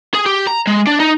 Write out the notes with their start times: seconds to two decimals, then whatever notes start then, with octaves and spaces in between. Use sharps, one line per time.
0.15 G#4
0.26 G4
0.47 A#5
0.67 G#3
0.87 D4
1.00 D#4